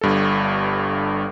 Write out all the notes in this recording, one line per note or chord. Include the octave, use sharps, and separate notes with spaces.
G1 G2 A4